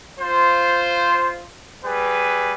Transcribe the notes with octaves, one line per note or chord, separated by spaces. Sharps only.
F4 C5
G3 G#4 B4